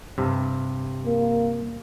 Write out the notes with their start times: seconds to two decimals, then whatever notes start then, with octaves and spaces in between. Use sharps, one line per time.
0.18 G2 C3
1.06 A#3